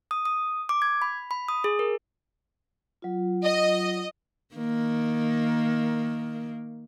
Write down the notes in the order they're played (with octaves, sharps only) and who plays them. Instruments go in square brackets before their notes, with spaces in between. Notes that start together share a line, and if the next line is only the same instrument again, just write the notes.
[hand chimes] D#6
D#6
D6
G#6
B5
B5
D#6
G#4
A#4
[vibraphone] F#3 F4
[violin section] D#5
[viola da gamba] D#3 A#3